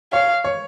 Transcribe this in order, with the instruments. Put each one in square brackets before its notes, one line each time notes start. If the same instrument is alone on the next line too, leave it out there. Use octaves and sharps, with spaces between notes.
[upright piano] C#5 [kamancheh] F5
[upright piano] C#5